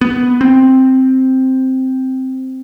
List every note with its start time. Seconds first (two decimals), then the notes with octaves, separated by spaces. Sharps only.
0.01 B3
0.41 C4